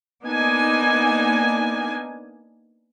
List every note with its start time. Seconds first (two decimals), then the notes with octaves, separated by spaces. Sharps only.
0.23 A#3 B3 D4 D#4 G#5